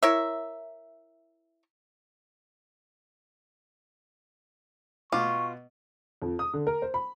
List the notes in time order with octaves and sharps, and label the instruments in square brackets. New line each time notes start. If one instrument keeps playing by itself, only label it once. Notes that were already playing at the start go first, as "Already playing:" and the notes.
[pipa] E4 A#4 C#5 E5
[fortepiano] B2 D6 [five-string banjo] F4 [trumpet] C#6
[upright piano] F2
D#6
D3
A#4
C5
B5